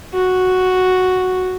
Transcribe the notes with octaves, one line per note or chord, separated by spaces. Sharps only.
F#4